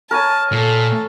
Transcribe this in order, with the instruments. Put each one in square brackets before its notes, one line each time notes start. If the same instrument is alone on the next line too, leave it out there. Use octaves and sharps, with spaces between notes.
[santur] A#4 C#5 G#5 [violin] A5
[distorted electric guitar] A#2 [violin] A4